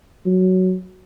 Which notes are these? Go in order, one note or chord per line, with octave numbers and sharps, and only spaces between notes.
F#3